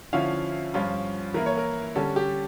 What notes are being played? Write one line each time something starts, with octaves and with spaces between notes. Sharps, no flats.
D3 F3 C#4 E4 F5
G2 F3 C#4 F4
E3 A#3 E4 A#4
C#5
A#4
D3 G3 C#4 A4
G4